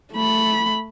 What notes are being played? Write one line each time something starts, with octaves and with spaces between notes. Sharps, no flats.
A3 B5